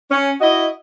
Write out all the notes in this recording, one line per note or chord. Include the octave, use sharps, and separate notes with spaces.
C#4
E4 F#4 D#5